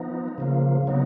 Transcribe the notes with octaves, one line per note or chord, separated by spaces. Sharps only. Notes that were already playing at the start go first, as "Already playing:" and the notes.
Already playing: F3 B3 D#4
C#3 F3 A#3
C#3 F#3 B3 D#4